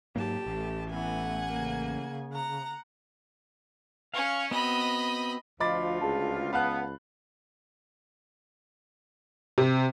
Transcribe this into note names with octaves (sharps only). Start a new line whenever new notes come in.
G#2 F#3 A#3 G4 A5
A1 A3
E3 B3 F#5 G#5
C#3 A#3
F#5 A#5
C#4 C#5 F5
B3 C4 F#4 D#5 B5
D2 F3 F4 D#5 B5 D6 A6
C#2 G#4 A5
B3 F5 A5 B5 F#6
C3